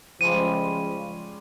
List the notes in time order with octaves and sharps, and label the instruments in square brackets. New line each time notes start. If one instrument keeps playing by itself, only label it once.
[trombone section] C#3 F3 [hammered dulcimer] G3 G#3 C#4 [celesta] D#7